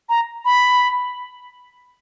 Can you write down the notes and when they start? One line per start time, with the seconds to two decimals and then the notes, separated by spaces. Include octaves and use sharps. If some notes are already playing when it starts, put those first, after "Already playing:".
0.09 A#5
0.45 B5